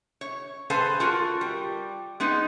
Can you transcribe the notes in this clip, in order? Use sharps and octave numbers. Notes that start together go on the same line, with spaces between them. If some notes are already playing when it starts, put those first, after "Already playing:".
C#5
G#4 A4 B4 C5 F5 G#5
F4 F#4 A4 A#4
G3
G#3 B3 D#4